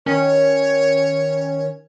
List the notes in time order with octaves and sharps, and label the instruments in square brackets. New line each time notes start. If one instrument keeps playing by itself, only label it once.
[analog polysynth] D#3 C#4 [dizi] C#5